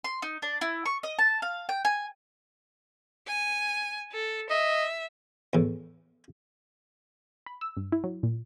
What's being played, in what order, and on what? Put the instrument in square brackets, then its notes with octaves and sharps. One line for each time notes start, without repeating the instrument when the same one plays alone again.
[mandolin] C6
D#4
D4
E4
C#6
D#5
A5
F5
G5
G#5
[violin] G#5
A4
[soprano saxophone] D#5 [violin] E5
[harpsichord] E2 A2
[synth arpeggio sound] B5
E6
G2
E4
F#3
A#2